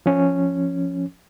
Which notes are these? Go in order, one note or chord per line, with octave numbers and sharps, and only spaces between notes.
F3 C#4